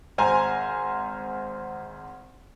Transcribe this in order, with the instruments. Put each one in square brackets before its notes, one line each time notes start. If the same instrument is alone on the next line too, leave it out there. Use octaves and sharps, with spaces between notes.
[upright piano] G#1 C5 G#5 A#5